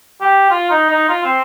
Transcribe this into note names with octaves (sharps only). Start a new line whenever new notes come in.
G4
F4
D#4
D#4
F4
C4